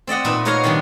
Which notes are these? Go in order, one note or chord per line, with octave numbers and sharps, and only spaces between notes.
C4 D5 D#5 F#5
A#2 D#4 B4 E5
D#4 F#4 A#4 C#5 D#5 F5
C3 D#3 G3 B3 D4